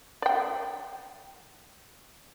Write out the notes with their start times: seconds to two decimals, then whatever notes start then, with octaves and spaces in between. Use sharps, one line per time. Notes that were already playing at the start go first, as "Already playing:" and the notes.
0.22 D5 G5